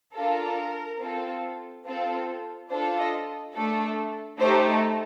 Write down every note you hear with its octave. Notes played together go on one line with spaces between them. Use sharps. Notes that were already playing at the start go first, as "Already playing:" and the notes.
D4 F4 A4 A#4
C4 F4 A4
C4 F4 A4
D4 F4 A4 C5
D#5
A3 D4 A4
A3 D#4 G4 C5
A4